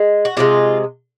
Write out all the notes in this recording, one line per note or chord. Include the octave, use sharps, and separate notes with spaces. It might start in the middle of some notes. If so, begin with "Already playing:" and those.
Already playing: G#3
F#4
C3 F3 G#3 F4